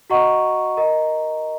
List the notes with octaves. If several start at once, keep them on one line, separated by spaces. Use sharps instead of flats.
F#4 D#5 F#5 A#5 C#6
A#4 D#5 A#5